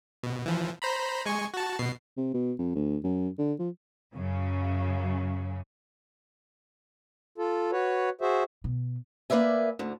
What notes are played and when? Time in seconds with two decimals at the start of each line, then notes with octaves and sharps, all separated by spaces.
0.23 B2
0.46 E3 F3
0.82 C5 A#5 B5
1.26 G#3 G#5 C#6
1.54 F#4 A5
1.79 B2 C7
2.17 C3
2.34 B2
2.59 F2
2.75 D2
3.04 F#2
3.38 D3
3.59 F3
4.13 F#2 C#3
7.38 F4 A4
7.72 F#4 B4 C#5
8.21 F#4 G#4 C5 E5
8.64 B2
9.30 A#3 B4 D5 E5 G#5
9.79 D2 D3